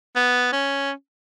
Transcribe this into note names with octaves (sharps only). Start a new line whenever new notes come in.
B3
C#4